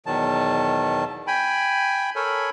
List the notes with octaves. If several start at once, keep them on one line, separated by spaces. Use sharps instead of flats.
E2 B2 D#3 F#3 A5
G5 G#5 B5
A4 A#4 C#5 G#5 B5